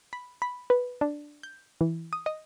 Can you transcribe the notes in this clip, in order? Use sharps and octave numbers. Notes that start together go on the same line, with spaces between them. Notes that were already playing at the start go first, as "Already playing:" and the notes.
B5
B5
B4
D4
G6
E3
D#6
D#5